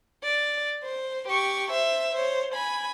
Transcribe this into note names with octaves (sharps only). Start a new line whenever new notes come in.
D5
C5
G4 C#6
C5 E5
C5 C#5
G#5 B5